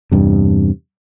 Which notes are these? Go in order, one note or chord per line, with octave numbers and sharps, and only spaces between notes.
E2 G2 C3